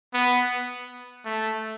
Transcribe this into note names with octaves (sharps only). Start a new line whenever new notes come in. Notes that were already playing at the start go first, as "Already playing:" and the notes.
B3
A3